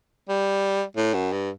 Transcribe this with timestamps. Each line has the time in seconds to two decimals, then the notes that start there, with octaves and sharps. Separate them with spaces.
0.29 G3
0.97 A2
1.14 F#2
1.32 G2